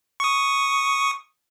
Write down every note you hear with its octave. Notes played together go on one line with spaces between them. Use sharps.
C#6 D#6